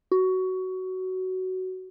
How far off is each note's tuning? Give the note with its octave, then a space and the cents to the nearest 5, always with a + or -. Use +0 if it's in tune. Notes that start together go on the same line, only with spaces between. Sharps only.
F#4 +15